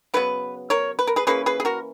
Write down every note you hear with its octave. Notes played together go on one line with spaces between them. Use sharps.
C#3 F#3 B3 B4
A#4 C#5
B4
A#4
G#4 B4
E3 A#3 C#4 G#4 B4
G#4 B4
G#4
F#4 A#4